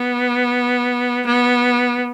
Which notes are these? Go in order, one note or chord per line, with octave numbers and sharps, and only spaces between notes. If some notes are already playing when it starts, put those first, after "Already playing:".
Already playing: B3
B3